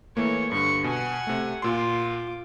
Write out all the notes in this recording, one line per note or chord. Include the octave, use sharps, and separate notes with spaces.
E3 A3 A#3 C#5
G2 D3 C#6
B2 F#5 G#5
C3 A3
A#2 F4 C6 D6